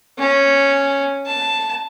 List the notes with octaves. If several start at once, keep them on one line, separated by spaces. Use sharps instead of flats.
C#4
A5